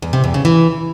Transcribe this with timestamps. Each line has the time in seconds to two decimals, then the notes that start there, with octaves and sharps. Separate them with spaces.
0.02 E2
0.13 C3
0.24 E2
0.34 C#3
0.45 E3